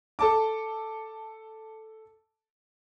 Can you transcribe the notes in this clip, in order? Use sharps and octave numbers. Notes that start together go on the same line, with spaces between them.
A4 A5 D6